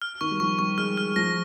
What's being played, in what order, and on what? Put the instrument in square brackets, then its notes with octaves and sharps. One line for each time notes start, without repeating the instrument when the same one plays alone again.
[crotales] F6
[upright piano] D#3 [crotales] C#6
[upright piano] G3
[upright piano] F3 [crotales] C#6
[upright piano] G3 [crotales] C#6
[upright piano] G#3 [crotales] F6
[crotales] F6
[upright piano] F3 [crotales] A#6